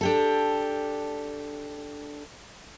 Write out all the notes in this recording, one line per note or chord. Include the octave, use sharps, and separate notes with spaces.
D4 G4 A4